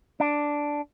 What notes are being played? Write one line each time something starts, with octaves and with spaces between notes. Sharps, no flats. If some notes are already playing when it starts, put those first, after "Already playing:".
D4